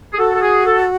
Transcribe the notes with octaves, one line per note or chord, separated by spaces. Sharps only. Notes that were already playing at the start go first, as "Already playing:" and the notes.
G#4
F#4 A4
A4
G#4
A4